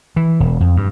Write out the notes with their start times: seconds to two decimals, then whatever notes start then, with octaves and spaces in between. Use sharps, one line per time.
0.16 E3
0.40 E1
0.60 F2
0.77 G2